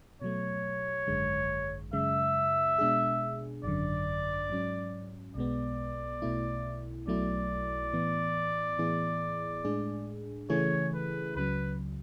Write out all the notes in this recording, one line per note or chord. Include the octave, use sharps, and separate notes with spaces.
B2 F#3 A3 C#5
G#1 F#2 D3 G#3
F#2 C#3 G#3 E5
B2 G#3 D4 G#4
G#1 F#2 D3 D5
G#2 F#3 C#4
B1 B2 G#3 B3 D5
B1 B2 A3 E4
B1 B2 F#3 A3 E4 D5
A2 E3 B3
A2 E3 B3 E4 G#4
A2 G#3 D4 G#4
C#3 E3 A3 E4 G#4 C#5
B4
C#2 C#3 F#3 B4